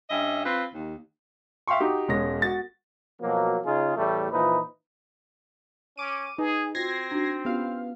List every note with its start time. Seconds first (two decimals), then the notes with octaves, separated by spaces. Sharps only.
0.10 G2 C#4 D#5 E5
0.44 C4 F4 B4
0.74 D#2
1.67 E5 F5 G5 C6 C#6
1.80 D#4 F#4 G4
2.08 E1 G#3 C#4 A#6
2.42 F#4 A6
3.20 B2 F3 F#3 A#3
3.65 C#3 D#4 F4 G#4
3.97 E2 A2 G3 A3
4.32 A#2 E3 F3 D#4 B4
5.97 C#4 D6 D#7
6.38 D#4 G#4 B4
6.75 C4 F4 F#4 G#6 A#6 C7
7.11 D4 D#4 F#4
7.45 B3 C#4 F4 G4 F5